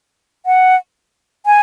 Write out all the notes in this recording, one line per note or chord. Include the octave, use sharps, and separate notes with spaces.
F#5
G#5